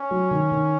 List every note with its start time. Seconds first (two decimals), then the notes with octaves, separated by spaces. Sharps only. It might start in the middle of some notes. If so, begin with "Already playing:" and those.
Already playing: C#4
0.11 F#3
0.31 D#3
0.52 D#3